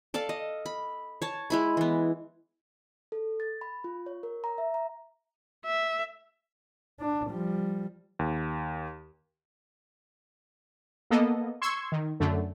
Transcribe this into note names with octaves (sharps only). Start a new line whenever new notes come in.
A4 D5 F5 A5
D#5
B5
C#5 A5
G#3 E4 B5
E3 B3
A4
A6
B5
F4
C#5
A#4
A#5
E5
A#5
E5
D4
F3 G3
D#2
A#3 B3 A4 D#5
C6 C#6 E6 G#6
D#3
F#2 D3 A3